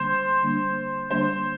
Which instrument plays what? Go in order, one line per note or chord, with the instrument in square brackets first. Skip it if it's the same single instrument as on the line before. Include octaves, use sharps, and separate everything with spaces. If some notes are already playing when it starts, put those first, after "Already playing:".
Already playing: [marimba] D3 G3 A#3 D4 [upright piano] C5
[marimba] D3 G3 A#3 D4
[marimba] D3 G3 A#3 D4 [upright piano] C5